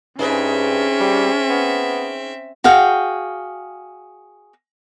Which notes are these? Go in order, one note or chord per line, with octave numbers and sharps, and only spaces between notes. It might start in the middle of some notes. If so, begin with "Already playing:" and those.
G2 C4 C#4 D#4 G#4 B4 E5
G3
B3
F#4 G#4 F5 G5